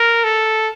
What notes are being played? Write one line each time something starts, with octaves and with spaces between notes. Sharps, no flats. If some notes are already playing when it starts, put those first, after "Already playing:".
Already playing: A#4
A4